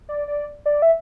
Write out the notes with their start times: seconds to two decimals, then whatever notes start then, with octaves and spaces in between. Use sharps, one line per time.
0.09 D5
0.28 D5
0.66 D5
0.82 E5